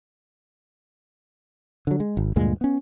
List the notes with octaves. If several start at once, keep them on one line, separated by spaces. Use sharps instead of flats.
D3 F#3
G#3
G#1
D2 G2 A#2 G#3
B3 C#4